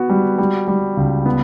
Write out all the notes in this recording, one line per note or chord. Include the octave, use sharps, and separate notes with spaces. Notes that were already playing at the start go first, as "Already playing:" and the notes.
Already playing: B3 F#4
G3
G3
G3
C#2
B3